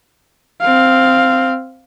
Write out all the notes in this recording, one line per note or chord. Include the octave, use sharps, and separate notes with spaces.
C4 F5